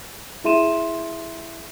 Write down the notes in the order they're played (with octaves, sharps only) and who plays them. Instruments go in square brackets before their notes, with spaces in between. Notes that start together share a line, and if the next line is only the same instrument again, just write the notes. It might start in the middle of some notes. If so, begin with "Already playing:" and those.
[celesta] E4 G#4 E5 C6 D#7 E7